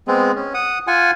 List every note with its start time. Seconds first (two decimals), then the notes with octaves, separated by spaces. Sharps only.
0.08 G#3 B3 C4
0.35 C#4
0.54 F#5 D#6
0.87 F4 F#5 G#5